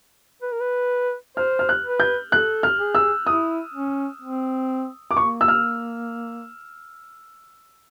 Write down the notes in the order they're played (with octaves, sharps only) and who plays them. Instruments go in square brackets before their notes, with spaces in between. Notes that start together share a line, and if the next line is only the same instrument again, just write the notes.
[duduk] B4
A#4
B4
[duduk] C5 [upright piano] F6
[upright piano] F6
F#6
[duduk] B4
[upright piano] G6
[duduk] A4 [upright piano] F#6
[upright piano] F6
[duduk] G#4
[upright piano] E6
[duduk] E4 [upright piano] D#6
[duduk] C#4
C4
[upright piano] D6
[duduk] A#3 [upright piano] C#6
[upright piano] E6
F6